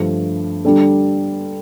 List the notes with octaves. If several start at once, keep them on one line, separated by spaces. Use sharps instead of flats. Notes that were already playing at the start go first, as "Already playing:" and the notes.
Already playing: G2 D3 F3 A3
D3 G3 D4 A4